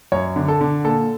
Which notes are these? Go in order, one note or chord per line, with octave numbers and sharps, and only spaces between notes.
F#2 C#5
D3
A4
D3
A#2 A4